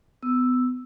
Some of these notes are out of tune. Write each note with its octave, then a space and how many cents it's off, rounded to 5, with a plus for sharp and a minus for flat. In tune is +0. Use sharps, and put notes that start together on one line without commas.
B3 +30 E6 +0